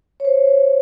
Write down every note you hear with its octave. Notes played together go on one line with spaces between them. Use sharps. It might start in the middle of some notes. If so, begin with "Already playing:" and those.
C#5
C5